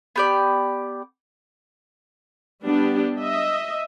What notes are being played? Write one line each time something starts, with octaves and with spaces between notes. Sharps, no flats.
B3 G4 D5
G3 B3 D4 G4
D#5 E5